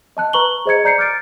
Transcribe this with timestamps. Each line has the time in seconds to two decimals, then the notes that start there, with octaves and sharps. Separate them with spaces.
0.17 D#5 A5 F#6
0.33 B4 A#5 C#6 F#7 G7
0.65 G#4 C5 D#5 A#5 G#6 C#7
0.84 D5 A#5 G6 C7 C#7
0.98 D6 F6 G6 A6 D7